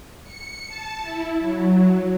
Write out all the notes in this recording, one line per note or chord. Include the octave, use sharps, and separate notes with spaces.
C#7
A5
E4
F#3